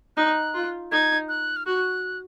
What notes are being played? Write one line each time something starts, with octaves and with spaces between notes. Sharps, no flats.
D#4 F#6
F4
D#4 G#6
F#6
F6
F#4 F#6